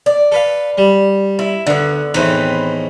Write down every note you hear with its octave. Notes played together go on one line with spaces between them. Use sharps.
D5
A4 B4 F5
G3
E4
D2 D3 B3
E2 A2 D#3 C4 B4